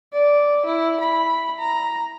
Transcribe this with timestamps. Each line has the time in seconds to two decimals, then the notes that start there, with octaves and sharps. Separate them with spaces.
0.13 D5
0.66 E4
1.01 B5
1.59 A#5